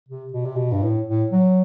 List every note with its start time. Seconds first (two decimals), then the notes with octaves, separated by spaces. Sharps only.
0.09 C3
0.34 B2
0.45 C3
0.56 B2
0.72 G2
0.83 A2
1.07 A2
1.32 F#3